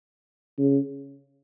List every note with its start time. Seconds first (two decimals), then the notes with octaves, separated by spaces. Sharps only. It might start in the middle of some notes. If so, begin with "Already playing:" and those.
0.58 C#3